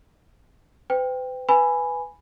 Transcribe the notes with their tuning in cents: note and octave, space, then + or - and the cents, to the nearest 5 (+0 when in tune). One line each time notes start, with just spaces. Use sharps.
B4 +45 G5 +10
B4 +0 G#5 +0 B5 +0